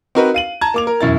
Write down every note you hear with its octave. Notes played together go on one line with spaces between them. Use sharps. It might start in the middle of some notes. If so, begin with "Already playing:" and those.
C4 D#4 F#4 A#4 B4
F5 D#7 F#7
A5 A#5 G#6
A#3 D6 F7
A#4
E1 F#2 E4 A6